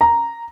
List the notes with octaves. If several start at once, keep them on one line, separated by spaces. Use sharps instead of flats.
A#5